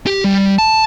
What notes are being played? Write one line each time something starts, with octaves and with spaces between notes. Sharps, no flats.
G4
G3
A5